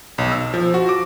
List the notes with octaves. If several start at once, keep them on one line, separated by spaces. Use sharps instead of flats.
B1
E6
F3
F#4
D6